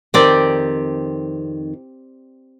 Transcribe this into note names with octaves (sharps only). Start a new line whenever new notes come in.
F2 D#3 C4 G4 D5